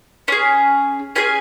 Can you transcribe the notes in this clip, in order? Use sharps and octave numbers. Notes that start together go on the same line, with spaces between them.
C#4 G#4
C#4 G#4 G#5